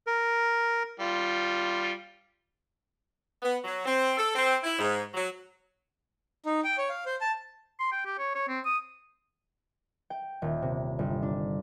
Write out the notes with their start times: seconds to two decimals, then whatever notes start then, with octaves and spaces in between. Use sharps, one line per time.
0.07 A#4
1.00 G3 F4
3.43 B3
3.65 F#3
3.86 C4
4.17 A4
4.36 C4
4.63 E4
4.79 G#2
5.14 F#3
6.46 D#4
6.64 G5
6.78 C#5
6.89 F5
7.06 C5
7.21 A5
7.80 C6
7.92 G5
8.06 G4
8.19 C#5
8.35 C#5
8.49 C4
8.65 D#6
10.10 G5
10.42 D#1
10.62 C3
10.99 G1
11.22 D4